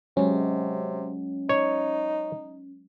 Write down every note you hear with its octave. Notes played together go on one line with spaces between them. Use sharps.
C3 F#3 G#3 C#4
D#4 C#5